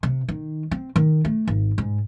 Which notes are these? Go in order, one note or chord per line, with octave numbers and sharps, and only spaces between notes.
C3
D#3
C4
D#3
A3
G#1
G#2